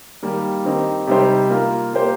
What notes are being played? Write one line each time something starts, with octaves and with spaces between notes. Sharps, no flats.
D#3 G3 A#3 G4
D#3 C4 D#4 G4
C3 G3 D#4 G4 C5
A#3 F4 A#4
A#3 G4 C5